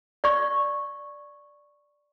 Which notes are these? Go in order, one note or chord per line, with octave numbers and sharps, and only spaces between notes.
D5 C#6